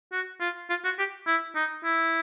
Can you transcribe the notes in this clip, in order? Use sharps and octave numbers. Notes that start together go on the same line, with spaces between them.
F#4
F4
F4
F#4
G4
E4
D#4
E4